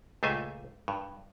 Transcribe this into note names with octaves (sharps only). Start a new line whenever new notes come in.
C#2 A#2 A3 C5 E5 G#5
G2